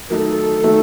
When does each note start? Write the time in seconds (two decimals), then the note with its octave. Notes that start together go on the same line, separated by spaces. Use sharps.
0.10 D#3 F#3 A3 D#4 A4 A#4
0.63 D#3 F#3 A3 D#4